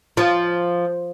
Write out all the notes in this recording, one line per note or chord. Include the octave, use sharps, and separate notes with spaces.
F3